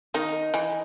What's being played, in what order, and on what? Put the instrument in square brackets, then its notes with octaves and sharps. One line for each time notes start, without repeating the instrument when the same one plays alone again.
[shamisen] D#3 [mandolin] D#4
[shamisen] E3